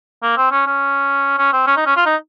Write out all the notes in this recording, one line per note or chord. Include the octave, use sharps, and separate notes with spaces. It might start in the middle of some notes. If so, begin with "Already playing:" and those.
A#3
C4
C#4
C#4
C#4
C4
C#4
D#4
C#4
F4
D#4